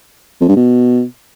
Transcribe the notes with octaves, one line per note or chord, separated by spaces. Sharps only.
F2
G2
B2